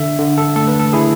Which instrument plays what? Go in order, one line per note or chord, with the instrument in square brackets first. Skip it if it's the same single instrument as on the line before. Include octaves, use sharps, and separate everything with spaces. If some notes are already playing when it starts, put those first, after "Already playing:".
Already playing: [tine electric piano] D3 E5
D3
A4
A3 A4
B4
A4
E4 G#4